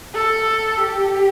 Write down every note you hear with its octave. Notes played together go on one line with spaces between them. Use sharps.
A4
G4